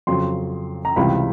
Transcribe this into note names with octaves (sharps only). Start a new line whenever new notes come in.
F2 C#3 F#3 C6
A#5
C#2 C3 E3 G3 B5